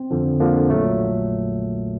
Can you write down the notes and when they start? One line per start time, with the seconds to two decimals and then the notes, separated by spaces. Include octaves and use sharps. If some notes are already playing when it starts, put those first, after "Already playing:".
Already playing: C4
0.11 F2 D3 F3
0.40 F2 D3 F3 A#3
0.69 A#1 A#2 F#3 A3